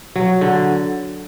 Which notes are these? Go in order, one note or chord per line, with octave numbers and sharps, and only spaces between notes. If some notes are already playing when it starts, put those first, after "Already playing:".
F#3
D3